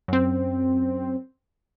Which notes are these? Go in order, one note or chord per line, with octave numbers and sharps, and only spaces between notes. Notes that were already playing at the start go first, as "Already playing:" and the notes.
F#2 C4